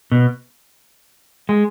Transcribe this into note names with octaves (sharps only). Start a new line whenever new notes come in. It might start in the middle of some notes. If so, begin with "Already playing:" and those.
B2
G#3